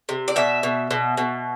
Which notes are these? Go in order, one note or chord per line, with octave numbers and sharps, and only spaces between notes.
C3
D5
B2 E5
B2
B2
B2